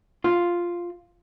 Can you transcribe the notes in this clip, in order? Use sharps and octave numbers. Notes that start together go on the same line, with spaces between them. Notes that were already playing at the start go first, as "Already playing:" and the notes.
F4